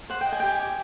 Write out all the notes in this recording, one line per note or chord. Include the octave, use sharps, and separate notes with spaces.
C5 F#5
G5
D#5
G#5
G5
G4 G#5
G4